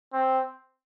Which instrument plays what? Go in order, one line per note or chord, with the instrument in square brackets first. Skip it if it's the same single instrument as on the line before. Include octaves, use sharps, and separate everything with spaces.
[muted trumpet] C4